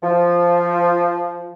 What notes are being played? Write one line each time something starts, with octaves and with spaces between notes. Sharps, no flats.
F3